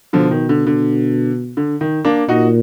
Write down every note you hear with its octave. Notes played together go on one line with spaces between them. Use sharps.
B2 D3 F3
D#3
D3
D3
D3
D#3
A#3 D4
A#2 D#4 F#4